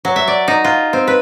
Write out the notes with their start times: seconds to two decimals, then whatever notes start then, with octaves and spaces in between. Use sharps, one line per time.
0.05 F#3
0.16 E5
0.28 D5
0.48 D#4
0.64 F4
0.93 C4
1.07 B4